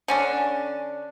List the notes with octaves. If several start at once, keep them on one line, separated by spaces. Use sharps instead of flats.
D3 C#4 D4